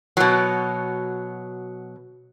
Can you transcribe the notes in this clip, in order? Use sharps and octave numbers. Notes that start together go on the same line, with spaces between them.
B2 F#3